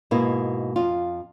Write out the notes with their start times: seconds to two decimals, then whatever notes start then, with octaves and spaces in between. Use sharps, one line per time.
0.11 G#2 B2 A#3 E4
0.76 F2 F4